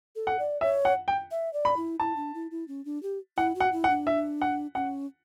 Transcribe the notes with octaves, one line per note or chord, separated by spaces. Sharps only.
A4
F#5
D5
C#5 E5
F#5
G5
E5
D5
B5
E4
E4 A5
D4
E4
E4
C#4
D4
G4
E4 F#5
F#4
F#5
E4
F#5
D4
E5
F#5
C#4 F#5